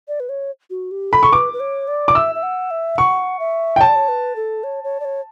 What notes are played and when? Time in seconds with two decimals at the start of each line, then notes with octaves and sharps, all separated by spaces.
0.08 D5
0.20 B4
0.29 C#5
0.70 F#4
0.91 G4
1.12 A4 B5
1.23 C#6
1.32 B4 D6
1.53 B4
1.60 C#5
1.88 D5
2.08 D6
2.15 E5 E6
2.35 E5
2.43 F#5
2.71 E5
2.98 F#5 C#6
3.39 E5
3.76 G5
3.80 C#5 A5
3.89 D5
3.95 C#5
4.08 B4
4.36 A4
4.64 C#5
4.84 C#5
5.00 D5
5.05 C#5